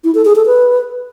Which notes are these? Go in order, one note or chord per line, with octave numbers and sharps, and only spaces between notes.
E4
A4
G#4
A4
B4